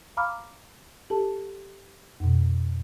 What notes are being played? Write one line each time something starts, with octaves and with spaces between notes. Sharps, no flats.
F5 A#5 B5 D6 F6
G4 A4 A5
F2 B2